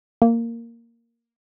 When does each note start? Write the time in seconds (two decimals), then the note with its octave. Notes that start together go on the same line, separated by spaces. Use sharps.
0.22 A#3